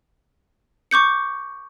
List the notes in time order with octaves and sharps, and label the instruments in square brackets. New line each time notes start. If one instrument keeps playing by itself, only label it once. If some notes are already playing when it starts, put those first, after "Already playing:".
[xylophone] C#6 D6 G6 C#7